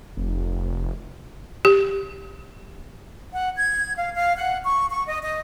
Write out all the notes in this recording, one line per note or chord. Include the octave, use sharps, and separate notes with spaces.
F1
G4
F#5
G#6
F5
F5
F#5
C#6
C#6
D#5
D#5